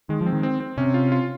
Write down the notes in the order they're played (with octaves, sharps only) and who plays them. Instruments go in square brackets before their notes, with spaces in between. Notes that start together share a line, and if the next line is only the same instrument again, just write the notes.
[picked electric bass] D#3 [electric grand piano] G#3
[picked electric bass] F3
[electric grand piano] C4
[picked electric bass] D#3
[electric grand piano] C4
C4
[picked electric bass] C3 [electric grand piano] C#4
[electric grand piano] F4
F4